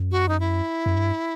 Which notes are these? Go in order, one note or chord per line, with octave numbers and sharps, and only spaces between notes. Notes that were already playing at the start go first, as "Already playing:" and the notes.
Already playing: F#2
F#4
D#4
E4
F#2
G2